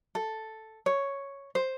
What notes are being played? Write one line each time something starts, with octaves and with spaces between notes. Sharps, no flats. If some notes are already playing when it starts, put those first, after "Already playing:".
A4
C#5
C5